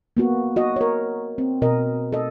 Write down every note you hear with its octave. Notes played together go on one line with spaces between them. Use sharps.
A#3 B3 F#4
F#4 D#5
A#4 C#5
C4
B2 A#4 D#5
A4 D#5